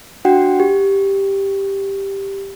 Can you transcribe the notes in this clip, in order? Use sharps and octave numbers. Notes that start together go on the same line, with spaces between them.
D4 F#4 F#5 G5
G4